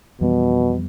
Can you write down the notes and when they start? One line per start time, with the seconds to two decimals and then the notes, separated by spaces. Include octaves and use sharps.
0.21 F2 B2 E3 G3 B3